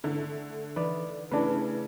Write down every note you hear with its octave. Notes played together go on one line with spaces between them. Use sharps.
D3 A3
E3 D#4 B4 D5
C#3 E3 A3 D4 B4